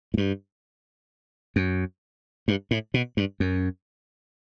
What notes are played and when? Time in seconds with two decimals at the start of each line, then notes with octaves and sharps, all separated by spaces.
0.14 A2
0.18 G2
1.56 F#2
2.48 G2
2.71 A2
2.94 B2
3.17 G2
3.40 F#2